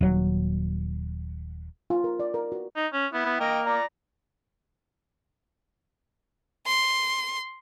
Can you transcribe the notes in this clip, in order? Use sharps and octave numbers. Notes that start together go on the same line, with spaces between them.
D#1 F#3
F4
A#4
D5
A#4
F#4
D#4
C#4
B3 E4
B3
A#3 D#5 G5
D5 A#5
C6